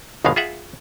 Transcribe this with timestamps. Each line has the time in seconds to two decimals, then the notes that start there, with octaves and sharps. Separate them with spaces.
0.25 G1 D#2 B2 D#3 G#3 F5
0.36 F4 G#4 E5 F#5